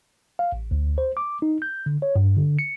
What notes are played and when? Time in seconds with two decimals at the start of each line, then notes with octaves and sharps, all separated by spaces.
0.39 F5
0.52 A1
0.71 D2
0.98 C5
1.17 D6
1.42 D#4
1.62 G6
1.86 D3
2.02 C#5
2.16 G2
2.36 D3
2.59 C#7